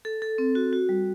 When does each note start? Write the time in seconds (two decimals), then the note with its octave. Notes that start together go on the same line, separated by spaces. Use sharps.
0.05 A4
0.22 A4
0.38 C4
0.55 F#4
0.73 F#4
0.89 G3